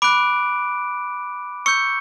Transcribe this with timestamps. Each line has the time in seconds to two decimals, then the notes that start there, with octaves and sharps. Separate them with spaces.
0.02 B5 D6 F#6 D7
1.66 C#6 E6 G6 C#7